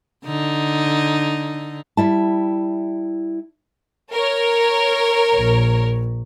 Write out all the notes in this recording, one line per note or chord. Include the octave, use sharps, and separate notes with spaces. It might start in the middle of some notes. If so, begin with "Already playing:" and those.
D3 D#4
G3 E4 A5
A#4 C#5
A#1